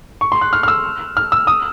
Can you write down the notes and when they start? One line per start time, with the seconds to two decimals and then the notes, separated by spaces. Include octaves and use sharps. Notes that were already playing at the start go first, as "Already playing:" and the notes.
0.21 C#6
0.32 C6
0.41 F#6
0.53 F6
0.63 F6
0.68 E6
1.17 F6
1.32 E6
1.47 D#6